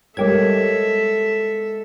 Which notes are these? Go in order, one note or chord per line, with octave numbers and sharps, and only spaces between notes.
G3 G#3 G4 A4 A#4 C#5 E5 G#6